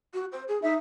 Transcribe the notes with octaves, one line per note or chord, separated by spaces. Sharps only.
F#4
C5
G#4
D#4 E5